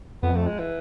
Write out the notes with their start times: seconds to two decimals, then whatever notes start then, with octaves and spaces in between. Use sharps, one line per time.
0.23 F2 B3
0.35 A3
0.47 G#3
0.59 E3